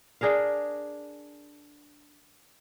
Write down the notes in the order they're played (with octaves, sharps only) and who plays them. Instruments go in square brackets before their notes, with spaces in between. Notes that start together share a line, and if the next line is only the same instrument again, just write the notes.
[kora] D4 G#4 A#4 F5